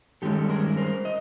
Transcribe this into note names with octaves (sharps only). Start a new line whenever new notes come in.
G2 D#3 G#3 C#4 G4 A4
A4
G#4 A#4
A#4 C5
D#5